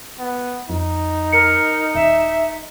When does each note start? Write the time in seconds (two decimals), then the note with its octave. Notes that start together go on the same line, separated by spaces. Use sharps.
0.19 B3
0.70 F2 D#4
1.33 A#4 C#7
1.95 D#1 E5